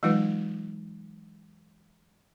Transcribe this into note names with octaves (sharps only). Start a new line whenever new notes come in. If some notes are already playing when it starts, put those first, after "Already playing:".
E3 F#3 G#3 D#4 F4 B4